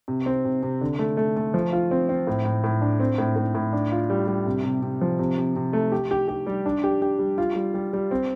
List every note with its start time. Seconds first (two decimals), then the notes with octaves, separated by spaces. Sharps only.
0.08 C3
0.26 C4
0.45 C3
0.63 C3
0.81 D3
0.99 A3
1.17 A3
1.36 A3
1.54 F3
1.73 F4
1.91 C4
2.09 C4
2.27 A2
2.45 A2
2.64 A2
2.81 D4
3.00 C4
3.18 A2
3.36 A2
3.55 A2
3.73 D4
3.92 F4
4.10 G3
4.28 G3
4.46 C3
4.64 C3
4.83 C3
5.01 F3
5.19 C3
5.38 C3
5.56 C3
5.73 A3
5.92 G4
6.11 G4
6.28 G4
6.47 G3
6.66 D4
6.84 G4
7.02 G4
7.19 G3
7.38 F4
7.56 G3
7.74 G3
7.93 G3
8.11 C4